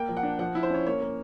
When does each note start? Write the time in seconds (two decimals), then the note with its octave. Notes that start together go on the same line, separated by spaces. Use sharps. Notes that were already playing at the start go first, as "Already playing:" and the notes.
Already playing: A#3 G5
0.09 F3
0.17 F#5
0.23 D4
0.39 F3 F#5
0.55 E4
0.63 C5
0.70 C#4 C#5
0.86 A#3 C#5
1.01 A#3